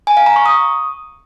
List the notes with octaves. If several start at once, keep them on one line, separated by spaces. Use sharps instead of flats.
G#5
F5
A#5
C#6
D#6